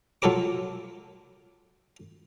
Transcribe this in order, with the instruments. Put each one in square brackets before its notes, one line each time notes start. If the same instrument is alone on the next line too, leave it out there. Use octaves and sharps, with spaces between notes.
[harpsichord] F#3 F4 A4 A#4 D6